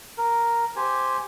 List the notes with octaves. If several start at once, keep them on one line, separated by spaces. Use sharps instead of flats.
A#4
G4 C5 G#5